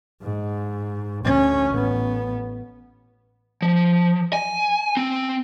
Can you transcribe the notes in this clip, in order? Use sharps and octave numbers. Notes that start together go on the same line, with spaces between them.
G#2
D2 C#4
A1 B3
F3
G#5
C4